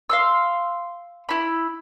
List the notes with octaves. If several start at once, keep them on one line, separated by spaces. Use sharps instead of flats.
F5 C6 E6
E4 B5